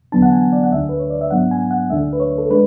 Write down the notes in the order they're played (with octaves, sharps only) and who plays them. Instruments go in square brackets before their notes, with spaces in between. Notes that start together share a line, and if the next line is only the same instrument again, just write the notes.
[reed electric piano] E2 D3 F#3 B3 D4 A5
F#5
G#5
D5
F#5
D2 D3 A3 D4 E5
B4
C#5
D5
E5
G#2 F#3 B3 D4 F#5
G#5
F#5
D2 D3 A3 D4 E5
B4
C#5
A4
G#3 D4 B4